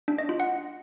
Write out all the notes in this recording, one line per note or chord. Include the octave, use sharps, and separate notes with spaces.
D4
D#5
F4
F#5